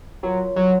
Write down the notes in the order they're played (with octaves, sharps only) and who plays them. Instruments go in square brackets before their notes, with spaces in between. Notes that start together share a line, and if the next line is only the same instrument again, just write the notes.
[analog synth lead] F#3 [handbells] F4 A#4 C#5
[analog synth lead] F#3